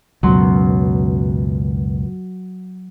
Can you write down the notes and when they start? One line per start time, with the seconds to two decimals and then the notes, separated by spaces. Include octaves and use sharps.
0.23 C#2 F#2 B2 F#3 C6